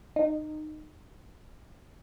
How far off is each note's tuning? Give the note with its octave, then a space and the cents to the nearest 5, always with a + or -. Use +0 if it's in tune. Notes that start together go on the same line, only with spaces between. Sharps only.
D#4 -20